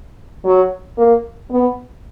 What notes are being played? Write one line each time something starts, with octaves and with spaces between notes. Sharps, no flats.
F#3
A#3
B3